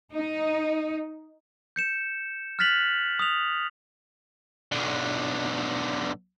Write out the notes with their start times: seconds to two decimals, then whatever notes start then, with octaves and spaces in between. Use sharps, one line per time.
0.13 D#4
1.76 G6 C#7 E7
2.59 F6 F#6 A6 B6 F7 F#7
3.19 D#6 F7
4.72 B1 D3